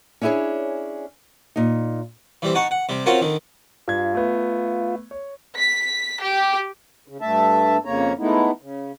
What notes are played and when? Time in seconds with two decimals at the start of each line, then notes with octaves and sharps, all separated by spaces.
0.21 C#4 D4 E4 G4 G#4 C#5
1.56 A#2 D#4
2.42 E3 G3 C4
2.55 D#4 F#5 A5 C#6
2.71 F#5
2.89 C3 G3
3.06 C4 C#4 F4 F#4 A#4
3.21 D3 D#3
3.88 G2 F4 G#6
4.15 A3 B3
5.11 C#5
5.58 B6
6.22 G4
7.08 C#3
7.21 G2 A3 E5 A5
7.85 F2 C#3 A#3 C#5 A#5
8.19 G#3 A3 B3 D#4 E4
8.62 C#3